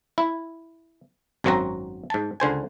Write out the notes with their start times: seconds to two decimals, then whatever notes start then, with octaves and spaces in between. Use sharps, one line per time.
0.18 E4
1.44 G#1 F#2 F#3 C4 F#4 A#5
2.10 G#2 A5
2.40 C#2 D3 C5 G#5